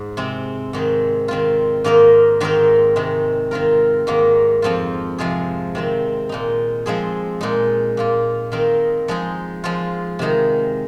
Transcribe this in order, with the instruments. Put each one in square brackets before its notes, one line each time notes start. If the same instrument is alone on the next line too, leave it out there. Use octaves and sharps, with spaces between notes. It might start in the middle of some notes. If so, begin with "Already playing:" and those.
Already playing: [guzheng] G#2
C3 G#3 C4
G#2 D#3 C4 G#4
D#3 C4 F4
G#2 D#3 A#3 D#4 A#4
G#2 D#3 C4 D#4 A#4
C3 D#3 G#3
D#3 C4 F4 A#4
G#2 D#3 A#3
F2 F3 C4 F4
C3 F3 G#3 F4 G#4
C3 D#3 C4
A#2 G#3 D#4
F3 G#3 C4 G#4
A#2 G#3 D#4
A#2 A#3 F4
D#3 C4 D#4 A#4
F3 G#3 D#4 G#4
F3 G#3 F4
C3 D#3 G#3 D#4